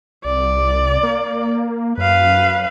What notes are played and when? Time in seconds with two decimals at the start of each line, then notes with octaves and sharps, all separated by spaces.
0.25 C2 D5
1.03 A#3
1.98 F#2 B4 F5